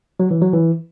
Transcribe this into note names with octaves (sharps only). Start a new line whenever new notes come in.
F#3
E3
F#3
E3